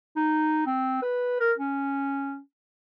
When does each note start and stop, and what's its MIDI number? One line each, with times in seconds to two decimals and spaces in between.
0.16 0.62 63
0.66 1.02 60
1.02 1.40 71
1.40 1.52 70
1.58 2.39 61